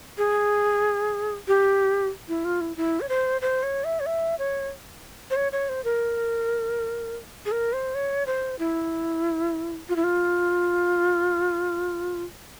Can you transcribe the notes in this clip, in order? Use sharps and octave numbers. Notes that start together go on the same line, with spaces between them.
G#4
G4
E4
F4
E4
E4
C#5
C5
C5
C#5
E5
C#5
E5
C#5
C5
C#5
C#5
C5
A#4
G#4
A#4
C5
C#5
C5
E4
F4
E4
F4